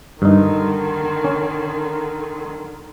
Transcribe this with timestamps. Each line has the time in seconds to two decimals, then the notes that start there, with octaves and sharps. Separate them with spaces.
0.22 G2 D3 D#3 D#4
1.24 C#4